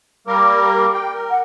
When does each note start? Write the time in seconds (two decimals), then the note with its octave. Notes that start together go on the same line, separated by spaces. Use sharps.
0.27 G3 A#3 A#4 D6
0.94 G5
1.14 A#4
1.29 F#5